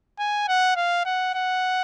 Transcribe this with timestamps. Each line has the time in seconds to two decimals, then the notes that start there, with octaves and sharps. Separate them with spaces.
0.19 G#5
0.48 F#5
0.76 F5
1.05 F#5
1.34 F#5